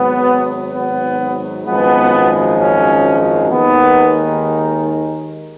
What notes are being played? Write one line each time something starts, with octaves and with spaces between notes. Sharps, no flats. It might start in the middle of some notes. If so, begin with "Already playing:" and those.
Already playing: G#1 G#2 F#3 B3
B3
G#1 F#2 F3 G#3 B3
C#4
D#2 D#3 G#3 B3